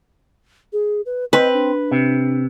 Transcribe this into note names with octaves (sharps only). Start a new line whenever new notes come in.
G#4
B4
C4 B4 D#5
D4
C3